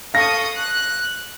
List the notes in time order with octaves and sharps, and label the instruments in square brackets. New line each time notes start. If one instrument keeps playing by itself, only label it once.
[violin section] A4 C#6 D#6 [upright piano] F5 A#6
[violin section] F#6